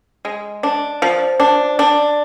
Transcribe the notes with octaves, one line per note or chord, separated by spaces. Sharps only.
G#3
D4
F3
D4
D4